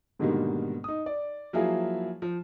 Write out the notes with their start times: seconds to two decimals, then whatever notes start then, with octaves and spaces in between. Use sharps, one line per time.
0.19 G#2 B2 D3 D#3 G3 A#3
0.84 D#4 D#6
1.06 D5
1.53 F3 F#3 A#3 E4 G#4 F5
2.22 F3